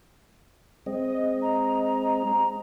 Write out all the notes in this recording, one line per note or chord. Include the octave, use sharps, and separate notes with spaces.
G#3 C4 D#5
A#5